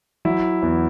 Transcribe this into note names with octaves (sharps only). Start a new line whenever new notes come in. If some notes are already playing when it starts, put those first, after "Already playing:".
F#3 E4
E2